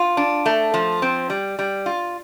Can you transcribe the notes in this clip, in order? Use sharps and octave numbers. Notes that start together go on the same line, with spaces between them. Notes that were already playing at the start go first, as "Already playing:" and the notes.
Already playing: F4
D4
A3
F3
C4
G3
G3
F4